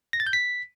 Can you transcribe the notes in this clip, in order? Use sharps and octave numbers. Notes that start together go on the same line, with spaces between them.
A#6
A6
G6
B6